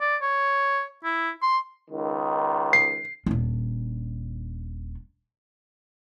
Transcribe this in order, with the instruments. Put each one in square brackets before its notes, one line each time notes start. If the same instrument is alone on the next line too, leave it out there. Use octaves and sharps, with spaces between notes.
[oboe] D5
C#5
E4
C6
[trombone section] C#2 D#3
[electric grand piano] C7
[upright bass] D#1 D4